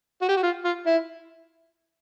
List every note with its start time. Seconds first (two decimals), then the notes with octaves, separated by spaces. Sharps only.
0.22 F#4
0.29 G4
0.36 F#4
0.43 F4
0.65 F4
0.86 E4